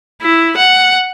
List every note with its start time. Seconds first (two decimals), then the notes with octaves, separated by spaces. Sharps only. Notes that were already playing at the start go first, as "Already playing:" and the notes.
0.22 E4
0.57 F#5